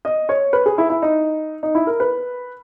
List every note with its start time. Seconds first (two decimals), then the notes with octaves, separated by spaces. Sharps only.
0.05 D#5
0.29 C#5
0.53 B4
0.66 G#4
0.78 E4
0.90 E4
1.02 D#4
1.63 D#4
1.75 E4
1.87 A#4
2.00 B4